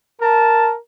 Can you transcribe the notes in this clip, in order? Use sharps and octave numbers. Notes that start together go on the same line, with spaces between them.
A#4 A5